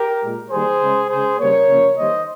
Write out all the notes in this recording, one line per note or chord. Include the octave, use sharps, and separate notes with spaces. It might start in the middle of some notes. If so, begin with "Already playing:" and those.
Already playing: G4 A#4
A#2 G#3
D#3 G3 A#3 G#4 C5
C#3 G#3
C#3 G#3 G#4 C5
C#3 G3 A#3 A#4 C#5
C#3 F3 A#3
D#3 G3 A#3 C5 D#5